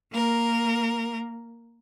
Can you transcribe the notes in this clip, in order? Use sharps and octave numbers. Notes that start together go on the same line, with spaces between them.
A#3 A#4